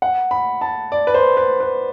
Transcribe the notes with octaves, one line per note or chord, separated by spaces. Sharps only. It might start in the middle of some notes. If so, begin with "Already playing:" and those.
F#5
B5
A5
D5
B4
C5
B4
B4